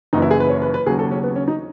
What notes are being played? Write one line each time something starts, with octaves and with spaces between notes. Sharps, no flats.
F#1 F#2 E3 D#4
E4
G#4
B4
C#5
B4
B4
D#2 C#3 F#3 G#4
A4
C#4
B3
C#4
D#4